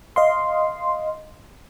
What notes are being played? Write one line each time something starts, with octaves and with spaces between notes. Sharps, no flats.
D#5 F5 C6